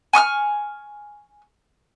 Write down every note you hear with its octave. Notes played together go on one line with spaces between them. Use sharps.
G#5 C#6 D#6 F6